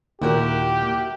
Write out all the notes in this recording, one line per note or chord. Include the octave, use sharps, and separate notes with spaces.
D#2 A#2 E4 F#4 G4 A#4